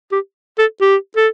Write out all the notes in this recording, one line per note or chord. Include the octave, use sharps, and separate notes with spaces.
G4
A4
G4
A4